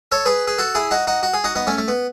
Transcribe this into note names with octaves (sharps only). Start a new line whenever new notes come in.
A4 C#5
G#4 B4
G#4
F#4 A4
E4 G#4
D#4 F#4
D#4 F#4
F#4
G#4
D#4 F#4
B3 D#4
A3 C#4
A3
B3